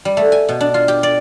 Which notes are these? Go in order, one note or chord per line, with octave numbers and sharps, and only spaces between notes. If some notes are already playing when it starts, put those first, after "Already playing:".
G3
A3
G#5
B2
D4
F4
G4
D5